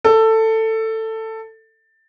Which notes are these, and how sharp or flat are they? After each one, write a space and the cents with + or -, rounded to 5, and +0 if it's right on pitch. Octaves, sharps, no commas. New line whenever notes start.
A4 +15